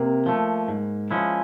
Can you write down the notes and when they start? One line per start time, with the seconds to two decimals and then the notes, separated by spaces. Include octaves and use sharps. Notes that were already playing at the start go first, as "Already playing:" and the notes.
Already playing: C3 A#3
0.26 F3 A3
0.68 G#2
1.11 F3 G#3 C#4 E4